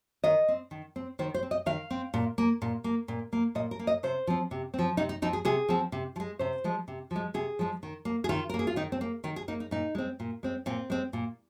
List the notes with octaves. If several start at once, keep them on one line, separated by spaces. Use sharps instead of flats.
D#3 D#5
C4
D#3
C4
D#3 C5
C5
C4
D#5
D#3 F5
C4
A#2
A#3
A#2
A#3
A#2
A#3
A#2 D#5
A#4
A#3
D#5
C3 C5
F3 C4
C3
F3 C4
C3 D#4
D#4
F3 C4 D#4
G#4
C3 G#4
F3 C4
C3
F3
G#3
C3 C5
F3 G#3
C3
F3 G#3
C3 G#4
F3 G#3
D#3
A#3
G#4
D#3 F4
A#4
A#3
G#4
F4
D#3 D#4
C4
A#3
D#3 A#4
G#4
A#3 D#4
D#4
A#2 D#4
G#3 C4
A#2
G#3 C4
A#2 C4
G#3 C4
A#2